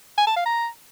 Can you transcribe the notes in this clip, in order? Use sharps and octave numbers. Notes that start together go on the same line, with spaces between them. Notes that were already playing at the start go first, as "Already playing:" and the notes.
G#5
A5
F5
A#5